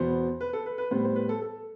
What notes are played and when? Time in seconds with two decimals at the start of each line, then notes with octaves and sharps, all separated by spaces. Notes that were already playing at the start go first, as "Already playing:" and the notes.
Already playing: E2 B2 B3 C5
0.41 B4
0.53 A4
0.66 B4
0.78 B4
0.91 A2 G3 B3 C5
1.04 C5
1.16 B4
1.29 A4
1.42 A4